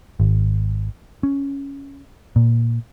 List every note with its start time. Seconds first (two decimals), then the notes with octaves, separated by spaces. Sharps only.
0.20 G#1
1.23 C#4
2.36 A#2